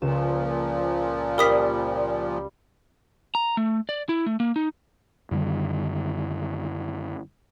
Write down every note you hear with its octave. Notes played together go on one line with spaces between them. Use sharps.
C#2 A#2 F3 E7
G3 A#4 D#6 B6
A#5
A3
D5
E4
A3
A#3
D#4
F#2 D3 D#3 G3